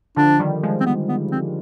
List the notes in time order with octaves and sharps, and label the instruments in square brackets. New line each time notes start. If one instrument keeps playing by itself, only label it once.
[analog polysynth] D3 F3 [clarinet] D4
[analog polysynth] D#3 G3
F3 G#3
[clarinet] C4
B3
B3
C4